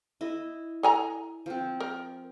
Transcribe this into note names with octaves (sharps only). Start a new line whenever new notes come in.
E4 D#5
A4 G#5 A#5
F3 C4
A#4